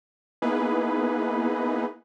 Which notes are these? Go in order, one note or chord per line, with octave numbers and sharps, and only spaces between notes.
A#3 B3 D#4 E4 G#4 B4